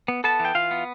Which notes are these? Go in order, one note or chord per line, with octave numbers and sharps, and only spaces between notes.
B3
B3 A4 A5
E3
G5
E3 F4 F5
B3